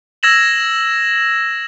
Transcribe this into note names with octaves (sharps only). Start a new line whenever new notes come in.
E6 G#6 A#6 E7 F#7